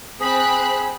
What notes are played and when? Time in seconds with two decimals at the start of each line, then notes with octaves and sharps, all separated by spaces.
0.20 C4 G#4 B5 F#6